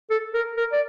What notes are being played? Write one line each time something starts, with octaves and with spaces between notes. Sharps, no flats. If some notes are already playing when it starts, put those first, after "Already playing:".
A4
A#4
A#4
D5